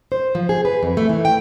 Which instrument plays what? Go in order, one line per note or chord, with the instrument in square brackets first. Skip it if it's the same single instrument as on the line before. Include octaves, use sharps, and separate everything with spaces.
[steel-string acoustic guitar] C5
F3
G#4
B4
F2
A3
E3
G5